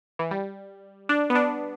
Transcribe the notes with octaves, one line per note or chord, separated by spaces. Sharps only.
E3
G3
D4
B3
D4